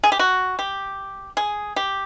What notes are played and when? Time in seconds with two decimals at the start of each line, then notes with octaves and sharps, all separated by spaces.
0.03 G#4
0.12 G4
0.19 F#4
0.59 G4
1.37 G#4
1.76 G4